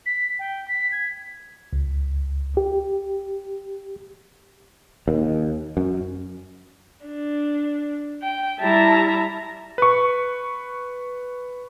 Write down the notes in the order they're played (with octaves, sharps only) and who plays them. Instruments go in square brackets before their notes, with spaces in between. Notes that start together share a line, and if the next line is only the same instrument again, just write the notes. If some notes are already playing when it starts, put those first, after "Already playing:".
[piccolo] B6
G5
B6
G#6
[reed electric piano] C#2
G4
[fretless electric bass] D#2
F#2
[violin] D4
G5
[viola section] G3 E4 A5 [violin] E5 A#5
[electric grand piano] B4 C#6